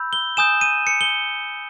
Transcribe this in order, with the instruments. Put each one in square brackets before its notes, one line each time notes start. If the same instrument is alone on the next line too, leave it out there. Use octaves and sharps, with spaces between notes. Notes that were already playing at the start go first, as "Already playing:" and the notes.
Already playing: [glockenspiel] B5 E6 G6
G7
G#5 D#6 G6 E7
D#7
C#7
G7